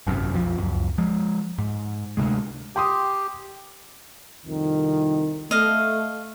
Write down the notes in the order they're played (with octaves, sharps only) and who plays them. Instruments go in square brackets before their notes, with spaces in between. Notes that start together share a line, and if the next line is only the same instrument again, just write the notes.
[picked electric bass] G#1 F#2 A2 C3
B1 F2 E3 F3
C#2 F#2
F3 G#3
G#2
D2 C3 G#3
[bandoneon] G4 [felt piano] G5 C6 D#6
[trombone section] C2 F2 D#3
[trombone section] A3 [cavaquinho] D#5 F5